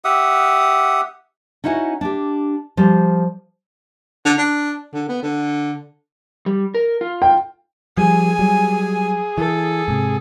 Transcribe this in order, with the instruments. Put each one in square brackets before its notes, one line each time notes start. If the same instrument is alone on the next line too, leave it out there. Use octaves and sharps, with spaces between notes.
[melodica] G4 E5 F#5 D#6
[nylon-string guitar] C#4 D#4 E4 F#4 F#5
D4 G4
F3 G3 C5
[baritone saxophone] D3
D4
D3
B3
D3
[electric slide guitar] G3
A#4
F4
[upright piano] G5
[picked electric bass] F3 G3 [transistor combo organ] G#4 [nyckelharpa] G#5
[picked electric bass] F#3 G3
[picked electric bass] E3 [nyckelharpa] A4
[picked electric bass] G#2 C3